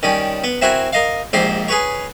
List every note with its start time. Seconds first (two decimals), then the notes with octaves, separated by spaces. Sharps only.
0.03 D#3 G3 C#4
0.44 B3
0.62 C4 E4 F#4 A#4 F#5 G#5
0.93 A#4 D#5 F5
1.33 A#1 G#2 G4 C5 C6
1.68 G#4 B4 C#5